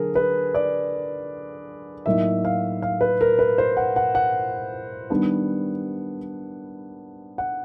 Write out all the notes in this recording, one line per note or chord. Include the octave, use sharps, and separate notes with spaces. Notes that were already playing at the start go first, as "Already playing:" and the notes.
Already playing: D3 F#3 G#4 A#4
B4
D5
A2 F#3 A#3 D#4 E5
F5
F5
B4
A#4
B4
C5
F#5
F#5
F#5
D#3 G3 B3 D4
F#5